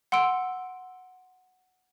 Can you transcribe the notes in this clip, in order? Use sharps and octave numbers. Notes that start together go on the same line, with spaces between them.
F#5 C6 E6 D7